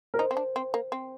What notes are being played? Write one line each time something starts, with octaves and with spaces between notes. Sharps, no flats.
A#4
D#4 C5
C4
D4
C4
A#3
C4